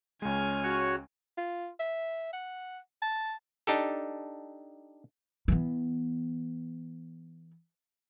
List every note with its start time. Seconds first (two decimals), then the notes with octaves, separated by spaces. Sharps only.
0.22 C#2 G#3 C#4 G#5 F6
0.63 F#4 C#5
1.37 F4
1.79 E5
2.33 F#5
3.02 A5
3.67 D4 D#4 G4 A4
5.48 E3 B3